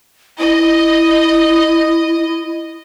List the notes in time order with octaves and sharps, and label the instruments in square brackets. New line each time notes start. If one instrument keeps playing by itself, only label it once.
[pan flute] E4 [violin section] D#5